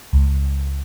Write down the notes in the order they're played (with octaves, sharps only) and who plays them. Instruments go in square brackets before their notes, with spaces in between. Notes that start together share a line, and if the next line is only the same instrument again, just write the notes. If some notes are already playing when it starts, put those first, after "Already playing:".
[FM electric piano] C#2